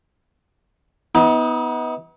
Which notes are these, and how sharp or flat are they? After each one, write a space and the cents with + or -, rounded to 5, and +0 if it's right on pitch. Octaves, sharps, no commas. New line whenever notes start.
B3 +0 D#4 +40